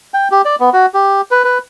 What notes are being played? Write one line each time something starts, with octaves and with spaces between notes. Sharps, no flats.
G5
G4
D5
B3
F#4
G4
B4
B4